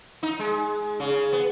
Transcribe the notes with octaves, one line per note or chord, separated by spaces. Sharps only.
D#4
G#3
C#3
B3